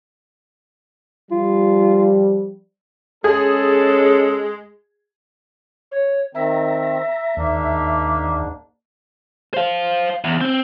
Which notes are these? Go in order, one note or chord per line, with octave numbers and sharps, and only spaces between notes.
F3 G3 F4
G#3 C#4 G#4 A4
C#5
D#3 C4 E5 A#5
D#2 G#2 A#3 D4
C5 F5
E2
C4